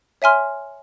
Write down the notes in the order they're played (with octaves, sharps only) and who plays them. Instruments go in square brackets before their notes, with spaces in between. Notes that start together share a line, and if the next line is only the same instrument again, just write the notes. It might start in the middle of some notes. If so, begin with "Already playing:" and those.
[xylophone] C#5 E5 G#5 C6 F6